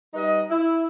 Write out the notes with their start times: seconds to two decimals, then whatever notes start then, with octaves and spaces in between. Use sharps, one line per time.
0.14 G3 D#4 B4 D#5
0.50 E4